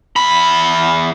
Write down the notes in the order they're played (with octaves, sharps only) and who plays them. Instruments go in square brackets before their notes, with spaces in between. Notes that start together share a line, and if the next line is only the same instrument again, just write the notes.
[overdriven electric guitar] E2 B5